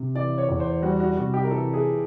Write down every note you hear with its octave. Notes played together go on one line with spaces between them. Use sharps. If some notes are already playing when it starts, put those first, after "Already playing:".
Already playing: C3
E3 D5
C#5
E2
C5
G3 F#4
F#4
C3 F#4
G4
A#4
E3 A4
G#4